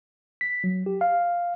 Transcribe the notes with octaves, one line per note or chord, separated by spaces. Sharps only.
B6
F#3
G4
F5